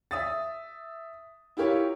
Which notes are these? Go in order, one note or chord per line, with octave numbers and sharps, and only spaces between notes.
E5 D#6 A6
E4 F4 G4 A#4 C#5